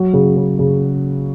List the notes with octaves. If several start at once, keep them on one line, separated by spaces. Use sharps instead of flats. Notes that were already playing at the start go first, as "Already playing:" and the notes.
Already playing: F#3
C#3
C#3
C#3